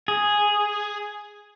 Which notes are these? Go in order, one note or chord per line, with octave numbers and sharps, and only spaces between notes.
G#4